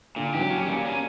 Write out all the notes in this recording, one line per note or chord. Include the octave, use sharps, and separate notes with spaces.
A#2 D3
E3 G4
F#3
C#4
G3
A#2
C#4